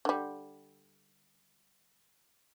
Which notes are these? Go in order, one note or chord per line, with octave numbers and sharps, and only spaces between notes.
D3 G3